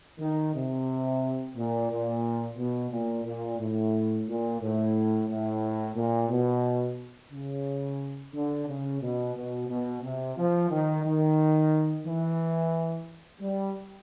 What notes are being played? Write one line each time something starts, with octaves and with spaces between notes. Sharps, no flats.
D#3
C3
A#2
A#2
B2
A#2
A#2
A2
A#2
A2
A2
A#2
B2
C#3
D3
C#3
B2
B2
B2
C3
F3
D#3
D#3
E3
G3